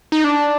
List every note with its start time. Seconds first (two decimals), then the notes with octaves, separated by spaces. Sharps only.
0.12 D#4
0.24 D4